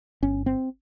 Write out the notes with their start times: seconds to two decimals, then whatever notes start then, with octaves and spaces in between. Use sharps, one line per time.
0.23 G1 C#4
0.46 C4